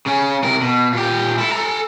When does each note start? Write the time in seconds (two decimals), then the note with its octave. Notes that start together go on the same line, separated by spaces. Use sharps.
0.06 C#3 C#4
0.44 C3 A#4
0.61 B2
0.93 A#2 G4
1.38 E4 A4
1.52 A4 A#5